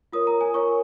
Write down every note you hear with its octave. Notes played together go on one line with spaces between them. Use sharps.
F4 A#4 C#5 D#6
A#5
G#5
F4 A#4 C#5 C#6